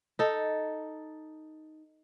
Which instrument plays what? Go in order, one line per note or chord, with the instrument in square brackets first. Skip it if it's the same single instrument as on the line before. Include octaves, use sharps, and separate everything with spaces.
[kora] D#4 A4